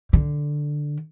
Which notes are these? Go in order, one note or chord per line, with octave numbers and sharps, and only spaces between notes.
D3